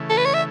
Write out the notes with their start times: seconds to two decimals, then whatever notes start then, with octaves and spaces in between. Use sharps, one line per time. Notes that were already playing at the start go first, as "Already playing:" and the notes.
Already playing: C#3 E3 A3
0.10 A4
0.17 B4
0.26 C#5
0.34 E5